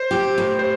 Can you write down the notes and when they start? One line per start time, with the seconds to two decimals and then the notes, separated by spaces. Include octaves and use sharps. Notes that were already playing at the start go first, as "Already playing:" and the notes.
Already playing: C5
0.11 G4
0.38 A2
0.59 C5